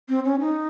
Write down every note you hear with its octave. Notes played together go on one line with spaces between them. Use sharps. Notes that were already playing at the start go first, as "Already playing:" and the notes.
C4
C#4
D#4